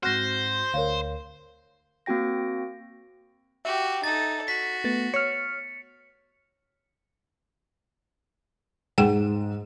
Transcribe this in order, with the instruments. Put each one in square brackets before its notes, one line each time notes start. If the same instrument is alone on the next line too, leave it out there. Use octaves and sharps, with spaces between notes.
[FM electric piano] G#2 C4 F#4 [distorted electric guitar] C5 [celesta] F6 F#6 A#6
[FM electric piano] D2 [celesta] A#4 C#5 F5
[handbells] A#3 C4 F#4 G5 A#6
[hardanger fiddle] F#4 G4 [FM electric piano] E5
[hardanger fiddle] D#4 A4 [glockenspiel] A6
[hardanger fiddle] F#4 [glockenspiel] B6
[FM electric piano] A3 B3 A6
[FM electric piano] C#5 F6 [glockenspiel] C#7
[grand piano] G#2 [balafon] G#4 F#5 G5